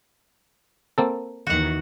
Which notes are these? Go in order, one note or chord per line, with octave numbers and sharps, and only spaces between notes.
A#3 C4 A4
D#2 D#3 E3 F#4 F#5